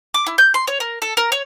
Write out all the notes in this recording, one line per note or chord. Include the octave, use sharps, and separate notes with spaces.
D6
E4
G6
C6
C#5
A#4
A4
A#4
C#5